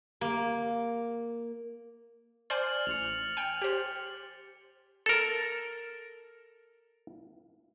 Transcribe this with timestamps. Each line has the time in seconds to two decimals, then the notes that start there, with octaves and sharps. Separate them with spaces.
0.21 A#3
2.50 C5 D5 G#5 F6 A6 F#7
2.87 A1 C#7 F7
3.37 G5 G#5
3.62 G4 C5
5.06 A4 A#4